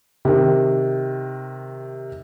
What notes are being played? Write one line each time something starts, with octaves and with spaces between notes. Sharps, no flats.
C3 D#3